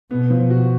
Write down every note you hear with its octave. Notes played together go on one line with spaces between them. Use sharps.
B2 B3
F3
F#4